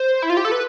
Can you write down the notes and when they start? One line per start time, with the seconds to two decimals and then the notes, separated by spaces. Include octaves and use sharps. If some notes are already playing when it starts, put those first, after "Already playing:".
Already playing: C5
0.22 E4
0.30 F4
0.37 G4
0.45 A4
0.52 B4